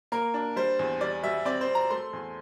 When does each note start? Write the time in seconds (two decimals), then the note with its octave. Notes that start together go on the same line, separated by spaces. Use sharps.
0.12 A#3 A#4
0.34 D4
0.56 G3 C5
0.79 E2
1.01 G3 D5
1.23 G3 E5
1.45 C4 D5
1.61 C5
1.68 C4
1.75 A#5
1.90 A3 C6
2.13 E2